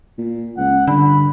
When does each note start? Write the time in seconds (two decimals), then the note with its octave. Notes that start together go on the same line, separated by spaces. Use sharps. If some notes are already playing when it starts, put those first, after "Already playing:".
0.18 A#2
0.57 C#2 F#5
0.87 G2 D3 B5